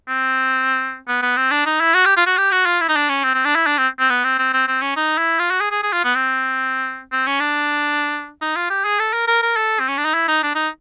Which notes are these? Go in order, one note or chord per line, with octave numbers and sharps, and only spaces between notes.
C4
B3
B3
C4
D4
D#4
E4
F#4
G4
F4
F#4
G4
F#4
F4
E4
D#4
D4
C#4
C4
C4
D4
E4
D4
C4
C4
B3
C4
C4
C4
C4
C#4
D#4
E4
F4
F#4
G#4
G#4
G#4
F4
B3
C4
C4
C#4
D4
D#4
F4
G4
G#4
A4
A#4
A#4
A#4
A4
C4
C#4
D4
D#4
E4
D#4
D4
D#4